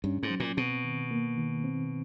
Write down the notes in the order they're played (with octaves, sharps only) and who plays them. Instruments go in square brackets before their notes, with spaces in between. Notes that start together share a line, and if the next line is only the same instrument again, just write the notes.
[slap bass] G2 [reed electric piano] C#4
[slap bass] G#2
[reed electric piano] F#3
[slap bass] A#2
[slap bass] B2 [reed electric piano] C4
[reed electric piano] D#3
A#3
D#3
C4